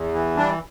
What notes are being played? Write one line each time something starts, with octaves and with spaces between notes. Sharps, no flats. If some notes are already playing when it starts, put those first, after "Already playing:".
Already playing: E2
E3
G3 D4